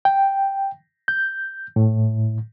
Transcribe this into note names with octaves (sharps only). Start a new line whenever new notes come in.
G5
G6
A2